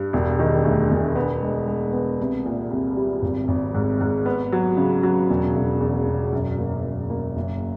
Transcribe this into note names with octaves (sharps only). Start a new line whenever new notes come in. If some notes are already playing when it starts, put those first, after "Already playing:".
Already playing: G2
E1
D#3
D2
E1
B3
G#3
G#3
B3
C2
A#2
C2
G3
G#1
G#1
G#2
G#2
B3
F#3
C#3
F#3
E1
E1
E2
E1
F#2
A#3
F#2
A#3
F#1